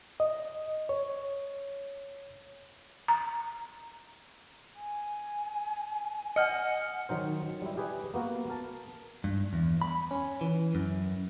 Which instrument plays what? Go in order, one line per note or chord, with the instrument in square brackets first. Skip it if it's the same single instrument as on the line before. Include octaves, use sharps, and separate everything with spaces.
[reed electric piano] D#5
C#5
[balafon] A#5
[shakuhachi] G#5
[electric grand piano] D#5 [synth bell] F#5 F6 C#7
[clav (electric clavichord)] D#3 F#3 D#4 C5
G3 E4
G4 G#4 B4
A#3 B3 F#4 A#4
A#4 A5
[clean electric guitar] G2
E2
B5
C#4
E3
F#2